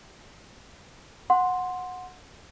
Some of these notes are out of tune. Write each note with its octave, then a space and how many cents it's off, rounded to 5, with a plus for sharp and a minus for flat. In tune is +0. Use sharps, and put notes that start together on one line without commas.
F#5 -15 C6 +0